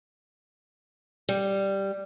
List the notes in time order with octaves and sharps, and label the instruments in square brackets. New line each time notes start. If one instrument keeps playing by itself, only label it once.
[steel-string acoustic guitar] G3